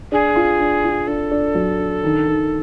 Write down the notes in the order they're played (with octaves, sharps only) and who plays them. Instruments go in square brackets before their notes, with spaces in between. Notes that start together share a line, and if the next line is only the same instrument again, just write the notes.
[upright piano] D4 [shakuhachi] G#4
[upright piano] F4
D4
F4
[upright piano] D4 [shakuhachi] A4
[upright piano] D4
F#3
D4
D#3
D#3